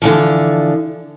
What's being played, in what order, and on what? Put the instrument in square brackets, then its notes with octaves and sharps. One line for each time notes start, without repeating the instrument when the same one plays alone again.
[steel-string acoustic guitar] D3 E3 F3